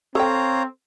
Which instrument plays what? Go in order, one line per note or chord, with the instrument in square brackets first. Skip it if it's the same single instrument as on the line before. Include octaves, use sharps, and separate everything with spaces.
[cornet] C4 [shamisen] A4 G5 [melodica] C#5 F5 A#5